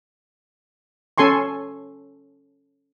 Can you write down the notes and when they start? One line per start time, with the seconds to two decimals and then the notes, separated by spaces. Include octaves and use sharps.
1.18 C#4 A4 G#5 C6 C#6